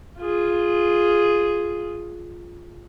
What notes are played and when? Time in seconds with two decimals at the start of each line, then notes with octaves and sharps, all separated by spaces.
0.18 F4 G#4